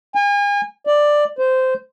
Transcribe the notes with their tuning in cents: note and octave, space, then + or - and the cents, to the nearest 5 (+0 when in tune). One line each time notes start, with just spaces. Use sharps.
G#5 -40
D5 +10
C5 -15